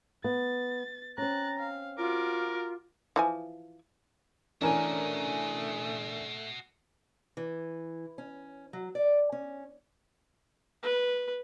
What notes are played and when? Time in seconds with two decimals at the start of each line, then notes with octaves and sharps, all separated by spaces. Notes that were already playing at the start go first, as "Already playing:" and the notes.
0.24 B3 A6
1.18 C4 C#4 A#5 F#6 A6
1.60 F5
1.98 F4 F#4 A#4 D6
3.16 E3 F3 G#5
4.61 E3 A3 C#4 D4 F#4 A#4 D#5 G#5
7.37 E3
8.18 C#4
8.73 F#3
8.95 D5
9.32 C#4
10.83 B4